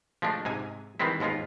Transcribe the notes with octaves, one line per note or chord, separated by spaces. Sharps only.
F3 G#3 A3 D4
G#2 C3 G#5
D#3 E3 G3 G#3 C4 E4
D#2 G#2 G#3 B3 F4